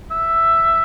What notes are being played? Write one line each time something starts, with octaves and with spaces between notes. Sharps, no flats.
E5